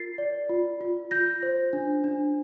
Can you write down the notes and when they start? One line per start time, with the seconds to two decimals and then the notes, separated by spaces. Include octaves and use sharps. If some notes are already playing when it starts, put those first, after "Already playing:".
Already playing: F4 A#4 A6 C7
0.18 D5
0.49 F4
0.81 F4
1.11 F4 G6 A#6
1.43 C5
1.73 D4
2.04 D4